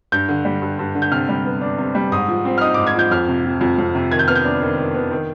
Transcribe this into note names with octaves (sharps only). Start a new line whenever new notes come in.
G2 G6
D3
G3
G2
G2
D3
G6
C3 F6
G3
B3
D4
C3
G3
G#2 D#6
F3
C4
F6
D#4 D#6
G#2 D6
G#6
F3 G6
F2 F6
C3
F3
F2
F2
C3
D#3 G#6
G6
B3 F6
G6
D4
D#3
D#3
B3
D#3